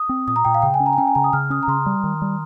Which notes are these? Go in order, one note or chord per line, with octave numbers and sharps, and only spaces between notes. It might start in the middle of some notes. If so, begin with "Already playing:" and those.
Already playing: D#6
C4
A#2 D#6
A#5
A#2 G5
F5
C#3 G5
G#5
C#4
A#5
G#5
C#4 G5
G#5
C#3 A#5
D#6
C#3 F6
C#4 D#6
A#5
C#3 C6
G3
D#3
G3